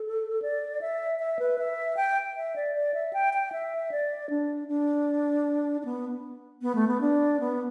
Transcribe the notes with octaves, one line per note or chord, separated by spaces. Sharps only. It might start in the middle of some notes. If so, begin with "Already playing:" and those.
Already playing: A4
D5
E5
E5
B4
E5
G5
E5
D5
D5
E5
G5
G5
E5
D5
D4
D4
D4
B3
B3
A3
B3
D4
B3